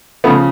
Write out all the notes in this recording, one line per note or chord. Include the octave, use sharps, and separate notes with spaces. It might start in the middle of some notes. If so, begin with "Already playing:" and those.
C#3 F3 A3 B3